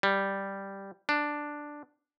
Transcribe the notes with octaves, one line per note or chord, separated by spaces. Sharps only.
G3
D4